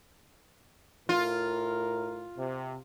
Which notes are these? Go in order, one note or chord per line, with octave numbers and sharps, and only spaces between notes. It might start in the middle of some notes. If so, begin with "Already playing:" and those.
A2 F4 A#4
C3